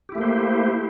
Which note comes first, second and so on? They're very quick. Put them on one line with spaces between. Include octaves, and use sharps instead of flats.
G4 E4 A3 A#3 C5